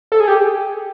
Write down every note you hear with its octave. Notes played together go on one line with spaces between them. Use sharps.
A4
G#4
G4